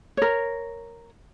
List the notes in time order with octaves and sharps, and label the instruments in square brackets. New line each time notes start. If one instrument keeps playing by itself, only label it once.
[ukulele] A#4 C#5